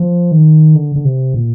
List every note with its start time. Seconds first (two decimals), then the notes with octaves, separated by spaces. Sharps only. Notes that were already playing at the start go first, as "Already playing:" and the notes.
Already playing: F3
0.31 D#3
0.75 D3
0.96 D3
1.05 C3
1.34 A#2